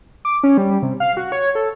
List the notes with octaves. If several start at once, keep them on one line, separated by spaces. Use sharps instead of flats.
D6
C#4
G3
G3
C3
F5
F#4
C#5
A4